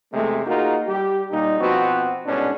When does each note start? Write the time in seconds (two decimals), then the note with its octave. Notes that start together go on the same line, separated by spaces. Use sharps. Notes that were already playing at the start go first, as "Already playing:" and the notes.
0.13 E2 C3 G#3 A3
0.46 A#3 D#4 F4 F#4 G#4 A#4
0.87 G3 G4
1.31 A#2 G3 D#4
1.60 B2 F3 B3 C4 F#4
2.26 C2 G#2 B2 C#4 D4